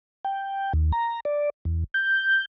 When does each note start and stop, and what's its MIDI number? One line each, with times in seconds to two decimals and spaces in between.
0.25 0.73 79
0.73 0.92 39
0.92 1.20 82
1.25 1.50 74
1.65 1.84 40
1.94 2.45 91